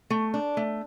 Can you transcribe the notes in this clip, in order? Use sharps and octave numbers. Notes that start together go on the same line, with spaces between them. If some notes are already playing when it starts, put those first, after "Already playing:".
A3
D4
A3